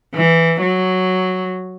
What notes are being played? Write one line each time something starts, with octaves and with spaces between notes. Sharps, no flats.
E3
F#3